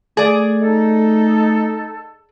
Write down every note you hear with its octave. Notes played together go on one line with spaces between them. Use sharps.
A3 G#4 D5
D#4 A4